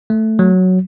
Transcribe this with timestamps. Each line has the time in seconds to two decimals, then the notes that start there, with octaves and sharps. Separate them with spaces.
0.10 A3
0.39 F#3